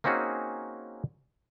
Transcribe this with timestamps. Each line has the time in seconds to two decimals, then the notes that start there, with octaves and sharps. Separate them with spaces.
0.04 A#3 C4 C#4 D#4 F#4 G#4